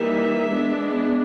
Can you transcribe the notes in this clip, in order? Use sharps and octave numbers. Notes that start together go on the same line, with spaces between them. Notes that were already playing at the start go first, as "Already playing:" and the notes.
Already playing: E3 G3 A#3 D#4 E5
G#3 B3 D4